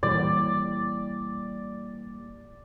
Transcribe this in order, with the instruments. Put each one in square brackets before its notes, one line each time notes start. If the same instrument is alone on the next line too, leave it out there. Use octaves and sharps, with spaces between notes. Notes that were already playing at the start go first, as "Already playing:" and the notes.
[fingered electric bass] A#2 E3 G3 [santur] D5